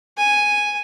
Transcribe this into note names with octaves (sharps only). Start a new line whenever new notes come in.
G#5